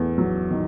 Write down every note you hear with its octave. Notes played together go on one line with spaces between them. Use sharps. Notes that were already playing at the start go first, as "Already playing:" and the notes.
Already playing: E2 A3
F#3
D#3